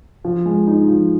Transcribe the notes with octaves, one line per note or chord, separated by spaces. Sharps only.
F3
G#3
D#4
F3